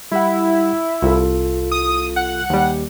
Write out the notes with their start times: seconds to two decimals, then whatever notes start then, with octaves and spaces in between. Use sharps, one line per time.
0.12 G3 E4 G4 F#5
1.02 C2 F4 A4
1.72 D#6
2.16 F#5
2.50 D#2 G3